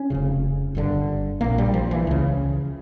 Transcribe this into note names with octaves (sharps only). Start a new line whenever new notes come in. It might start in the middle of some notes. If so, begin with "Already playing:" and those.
Already playing: C#4
F1 F2 C#3
G1 G2 D3
A#1 A#2 A#3
G3
F3
E3
C#2 C#3